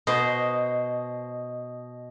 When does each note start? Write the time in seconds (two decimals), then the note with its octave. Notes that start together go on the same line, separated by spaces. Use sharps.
0.07 B2 C5 D#5